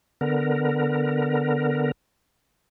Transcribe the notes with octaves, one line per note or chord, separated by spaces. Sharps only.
D3 B3 A#4